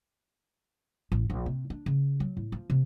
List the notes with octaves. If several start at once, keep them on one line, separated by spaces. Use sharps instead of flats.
A1
A#1
C3
D4
C#3
F#3
A2
F3
C3